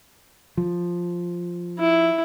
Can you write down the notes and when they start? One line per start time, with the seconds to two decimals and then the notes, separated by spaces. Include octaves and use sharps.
0.57 F3
1.79 E4